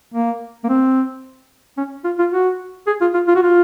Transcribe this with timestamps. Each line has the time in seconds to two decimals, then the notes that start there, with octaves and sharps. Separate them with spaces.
0.14 A#3
0.64 A#3
0.68 C4
1.77 C#4
2.04 F4
2.19 F4
2.32 F#4
2.87 G#4
3.01 F4
3.14 F4
3.28 F4
3.35 F#4
3.42 F4